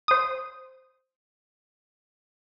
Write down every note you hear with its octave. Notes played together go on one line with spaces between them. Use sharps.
C5 D#6